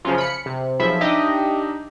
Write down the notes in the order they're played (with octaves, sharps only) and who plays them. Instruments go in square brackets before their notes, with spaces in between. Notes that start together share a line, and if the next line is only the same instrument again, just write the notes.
[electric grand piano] F#2 C#3 [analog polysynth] F3 C#4 F4
[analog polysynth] B5 C#7 [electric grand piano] F6
[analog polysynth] C3
[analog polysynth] B1 F3 E5 [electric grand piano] G#4 B5
[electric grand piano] D4 D#4 E5 [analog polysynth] G4 D#5